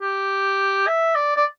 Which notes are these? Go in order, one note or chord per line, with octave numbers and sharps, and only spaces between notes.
G4
E5
D5
D5